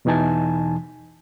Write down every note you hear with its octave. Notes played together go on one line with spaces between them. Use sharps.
E2 B2 E3 D#4 G#5 A5